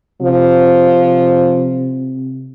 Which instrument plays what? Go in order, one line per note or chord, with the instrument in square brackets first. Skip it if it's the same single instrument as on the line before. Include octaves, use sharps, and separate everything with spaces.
[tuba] C3 [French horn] F3